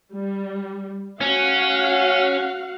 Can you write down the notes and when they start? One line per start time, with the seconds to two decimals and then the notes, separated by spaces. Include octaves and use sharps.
0.14 G3
1.21 C#4 F#4 F5 F#5